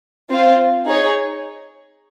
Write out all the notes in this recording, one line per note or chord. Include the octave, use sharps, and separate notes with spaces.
C4 F4 C5 F5
D#4 G#4 C#5